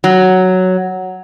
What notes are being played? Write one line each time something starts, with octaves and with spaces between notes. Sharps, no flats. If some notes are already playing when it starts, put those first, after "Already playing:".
F#3